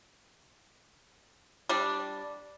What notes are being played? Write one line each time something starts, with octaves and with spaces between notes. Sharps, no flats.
G3 D4